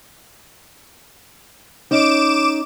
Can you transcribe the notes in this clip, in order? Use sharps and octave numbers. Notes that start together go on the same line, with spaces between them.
C#4 D#4 D6 D7 E7